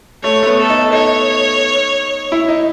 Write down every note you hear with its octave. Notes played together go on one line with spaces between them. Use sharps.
A3 C#5
A3
B3
A4
D#4
D#4 C#5
E4
D#4